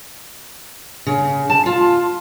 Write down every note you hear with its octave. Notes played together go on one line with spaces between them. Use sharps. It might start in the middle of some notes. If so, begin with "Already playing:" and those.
C#3
A5
F4